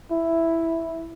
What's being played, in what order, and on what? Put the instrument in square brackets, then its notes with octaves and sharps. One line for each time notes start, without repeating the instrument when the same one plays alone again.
[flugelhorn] E4